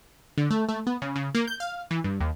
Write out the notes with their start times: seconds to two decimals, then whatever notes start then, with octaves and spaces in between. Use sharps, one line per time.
0.38 D3
0.51 A3
0.69 A3
0.87 B3
1.02 C#3
1.16 C#3
1.35 A#3
1.47 G6
1.60 F5
1.91 E3
2.04 G2
2.20 D#2